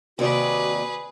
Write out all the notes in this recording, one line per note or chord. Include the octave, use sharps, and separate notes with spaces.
D#2 C3 F#4 G#4 B4 D5